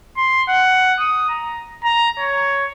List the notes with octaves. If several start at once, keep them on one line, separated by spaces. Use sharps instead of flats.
C6
F#5
D#6
A#5
A#5
C#5